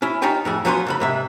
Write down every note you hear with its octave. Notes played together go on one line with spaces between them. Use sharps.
C#4 E4
C#4 D#4 F4 G4 G5 G#5
F2 A2 G#4
F3 F#3 B3 G#5 B5 C6
F2 C#3 B5
G#2 C3 E5